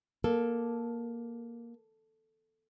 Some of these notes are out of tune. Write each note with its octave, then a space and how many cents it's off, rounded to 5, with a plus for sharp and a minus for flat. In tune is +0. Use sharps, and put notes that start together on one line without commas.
A#3 +10 A4 +0